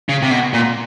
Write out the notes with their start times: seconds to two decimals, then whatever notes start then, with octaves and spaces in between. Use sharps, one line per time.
0.09 C#3
0.22 C3
0.31 B2
0.53 A#2